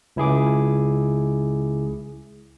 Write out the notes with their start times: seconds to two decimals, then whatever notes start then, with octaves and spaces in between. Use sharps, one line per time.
0.16 C#2 E4 G#4 D6